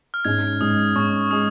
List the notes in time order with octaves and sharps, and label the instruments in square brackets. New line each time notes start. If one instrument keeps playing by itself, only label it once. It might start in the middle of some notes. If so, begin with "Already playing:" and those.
[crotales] F6
[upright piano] G#2 G#3 C#4 [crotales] G#6
[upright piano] G#2 G#3 C#4 [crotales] D#6
[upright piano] G#2 G#3 C#4 [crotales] C#6
[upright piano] G#3 C#4 [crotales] D#6